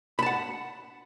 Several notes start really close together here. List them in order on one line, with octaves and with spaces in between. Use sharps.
B5 A5 F#5